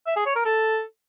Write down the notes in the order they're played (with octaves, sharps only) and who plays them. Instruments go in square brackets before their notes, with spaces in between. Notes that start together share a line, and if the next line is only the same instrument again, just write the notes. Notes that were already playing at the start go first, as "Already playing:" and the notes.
[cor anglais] E5
G#4
C#5
A#4
A4